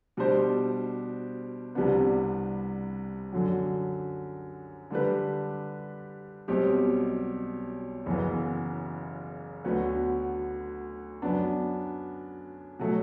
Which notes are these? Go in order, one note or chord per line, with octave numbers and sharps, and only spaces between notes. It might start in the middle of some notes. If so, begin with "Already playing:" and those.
B2 G3 D4 G4 C5
C2 C3 G3 B3 D4
F#2 D3 F#3
D3 G3 D4 G4 B4
B1 B2 G3 C4 G4
F#1 F#2 E3 B3
D2 D3 F#3 B3 F#4
F#2 F#3 B3 D4
B2 F#3 A3